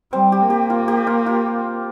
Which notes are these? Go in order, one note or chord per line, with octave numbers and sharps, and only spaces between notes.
G3 C4
G4
A#3
G4
F4
G4
F4
F4